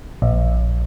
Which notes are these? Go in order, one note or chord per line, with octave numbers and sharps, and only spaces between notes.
A#1